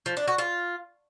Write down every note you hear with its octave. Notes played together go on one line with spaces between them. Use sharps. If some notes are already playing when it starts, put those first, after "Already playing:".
F3
D4
F#4
F4